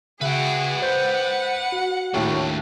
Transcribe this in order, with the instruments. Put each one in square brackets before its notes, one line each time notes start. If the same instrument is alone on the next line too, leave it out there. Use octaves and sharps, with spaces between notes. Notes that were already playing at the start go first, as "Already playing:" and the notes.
[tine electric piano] C#3 [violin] F#4 G#4 [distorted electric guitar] B4 G5 [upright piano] E5
[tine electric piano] C5 G6 [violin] F#5
[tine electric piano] F#4
[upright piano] D#2 A2 [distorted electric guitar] F#3 D4